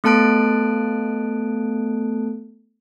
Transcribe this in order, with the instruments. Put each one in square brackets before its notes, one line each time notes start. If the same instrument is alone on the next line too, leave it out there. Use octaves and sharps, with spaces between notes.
[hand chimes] A3 B3 A4 A5 F#6 D7